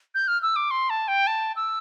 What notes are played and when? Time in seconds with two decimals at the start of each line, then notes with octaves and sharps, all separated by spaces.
0.15 G6
0.28 F6
0.42 E6
0.56 D6
0.71 C6
0.90 A5
1.08 G5
1.27 A5
1.56 E6